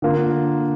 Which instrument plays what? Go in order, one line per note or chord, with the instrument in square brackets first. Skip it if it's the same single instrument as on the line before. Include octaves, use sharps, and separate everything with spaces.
[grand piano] D3 A#3 F4